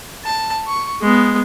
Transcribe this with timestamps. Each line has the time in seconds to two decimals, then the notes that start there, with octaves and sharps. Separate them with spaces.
0.25 A5
0.67 C#6
1.01 G#3 B3